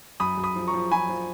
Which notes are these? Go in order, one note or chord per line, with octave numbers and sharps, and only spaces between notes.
F#2 B5 D#6
F#2
B5 D#6
F3
A#5 C#6
F3
F3 G#5 B5
F3